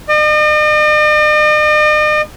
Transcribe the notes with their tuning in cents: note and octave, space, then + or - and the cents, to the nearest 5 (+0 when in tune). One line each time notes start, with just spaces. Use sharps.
D#5 -45